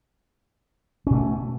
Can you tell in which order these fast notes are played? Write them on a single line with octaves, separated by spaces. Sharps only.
C#4 B2 A3